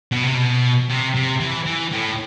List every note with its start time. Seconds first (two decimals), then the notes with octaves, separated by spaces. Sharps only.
0.12 B2
0.23 C3
0.34 B2
0.90 C3
1.15 C3
1.40 E3
1.66 E3
1.92 A2